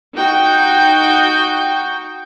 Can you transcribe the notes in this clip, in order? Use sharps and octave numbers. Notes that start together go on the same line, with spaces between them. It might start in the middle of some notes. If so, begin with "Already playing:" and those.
D#4 F#4 G5